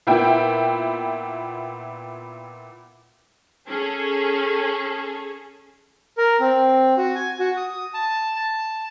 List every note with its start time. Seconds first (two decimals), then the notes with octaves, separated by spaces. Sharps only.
0.07 A#2 B3 E4 G5
3.68 C#4 G#4 A4
6.18 A#4
6.40 C4
6.97 F#4
7.15 G#5
7.39 F#4
7.57 D#6
7.94 A5
8.36 A5